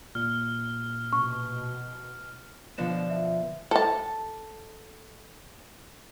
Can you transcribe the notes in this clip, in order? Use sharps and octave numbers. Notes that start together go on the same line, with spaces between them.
A#2 F6
B2 C#6
B2 D3 F3 E7
E5
A4 A5